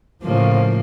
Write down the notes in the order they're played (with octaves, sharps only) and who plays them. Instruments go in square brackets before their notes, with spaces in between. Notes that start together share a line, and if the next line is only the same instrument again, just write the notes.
[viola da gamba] A2 C#3 A#3 [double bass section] F3